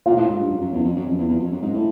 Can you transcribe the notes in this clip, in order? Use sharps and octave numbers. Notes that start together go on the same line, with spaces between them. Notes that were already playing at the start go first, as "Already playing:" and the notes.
A#2 F4
A2
G#2
G2
F#2
F#2
E2
F2
F#2
F2
E2
E2
F2
F#2
G#2
A2